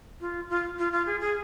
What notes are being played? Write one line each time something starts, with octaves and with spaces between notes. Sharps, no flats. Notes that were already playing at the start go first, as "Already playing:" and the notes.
F4
F4
F4
F4
G#4
G#4